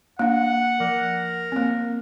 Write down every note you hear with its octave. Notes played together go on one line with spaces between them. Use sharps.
A#3 D4 F#5
F3 A#4
A#3 C4